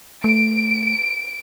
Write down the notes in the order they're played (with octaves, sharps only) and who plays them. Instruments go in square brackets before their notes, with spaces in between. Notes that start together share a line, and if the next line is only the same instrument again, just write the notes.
[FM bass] A3 [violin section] D7